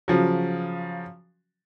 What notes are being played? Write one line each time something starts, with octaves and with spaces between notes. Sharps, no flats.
C#3 F3 F#3